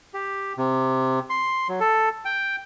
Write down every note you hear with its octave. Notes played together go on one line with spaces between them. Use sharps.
G4
C3
C6
F#3
A4
G5